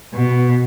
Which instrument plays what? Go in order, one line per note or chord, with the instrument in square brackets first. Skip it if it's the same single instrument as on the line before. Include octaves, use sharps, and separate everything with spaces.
[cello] B2